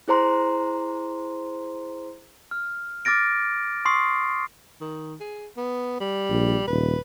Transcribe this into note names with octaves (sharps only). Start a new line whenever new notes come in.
E4 G#4 C5 A#5 C6
F6
D6 F6 A6 A#6 D7
C6 C#6 D#6 C7
D#3
G#4
B3
G3
A#1
D#1 B4